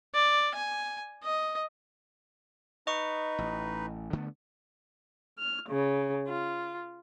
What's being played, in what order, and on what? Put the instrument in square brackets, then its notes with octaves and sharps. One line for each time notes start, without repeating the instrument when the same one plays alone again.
[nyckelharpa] D5
G#5
D#5
[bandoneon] D#4 B4 [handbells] D#5 C#6
[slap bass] A1
D3 A3 B3
[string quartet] F6
C#3
F4